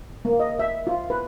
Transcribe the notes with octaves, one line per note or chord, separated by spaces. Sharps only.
A#3
D#5
E5
F4
B4